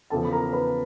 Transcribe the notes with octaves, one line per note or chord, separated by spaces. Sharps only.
E2 C#3 F3 A4 A5
B5
A#4 A#5
B4 B5